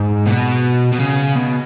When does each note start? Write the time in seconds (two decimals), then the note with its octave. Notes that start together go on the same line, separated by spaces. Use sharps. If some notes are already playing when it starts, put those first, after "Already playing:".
Already playing: G#2
0.26 B2
0.93 B2
1.00 C#3
1.36 B2